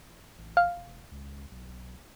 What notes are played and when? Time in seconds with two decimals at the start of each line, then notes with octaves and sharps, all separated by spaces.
0.38 A1
0.57 F5
0.76 E1
1.11 C#2
1.51 B1